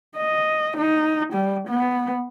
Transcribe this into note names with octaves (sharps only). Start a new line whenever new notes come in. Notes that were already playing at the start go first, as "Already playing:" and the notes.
D#5
D#4
G3
B3